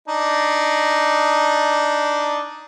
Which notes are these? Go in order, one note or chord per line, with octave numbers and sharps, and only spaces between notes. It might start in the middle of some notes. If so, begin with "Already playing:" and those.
D4 D#4